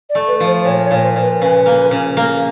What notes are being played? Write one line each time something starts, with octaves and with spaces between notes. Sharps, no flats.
D5
A3
B4
F3
C5
A#2 C#5
C#5
A#2
C5
A#2
B4
C#3 B4
A#3
C#3
A#3